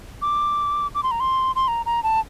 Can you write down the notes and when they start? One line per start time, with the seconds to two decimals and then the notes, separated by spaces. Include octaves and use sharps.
0.22 D6
0.95 D6
1.03 C6
1.11 A#5
1.20 C6
1.56 C6
1.68 A#5
1.86 A#5
2.03 A5